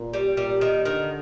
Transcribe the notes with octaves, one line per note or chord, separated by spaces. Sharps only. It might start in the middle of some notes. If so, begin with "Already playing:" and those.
Already playing: A#2
G3
A#2 G3
D#3
D3 D#3